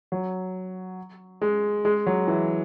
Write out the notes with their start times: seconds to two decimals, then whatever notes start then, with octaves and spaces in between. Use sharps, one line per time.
0.12 F#3
1.42 G#3
1.85 G#3
2.06 F#3
2.27 E3